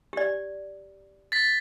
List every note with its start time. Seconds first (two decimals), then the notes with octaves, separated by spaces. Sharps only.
0.13 G4 D5
1.32 A6 B6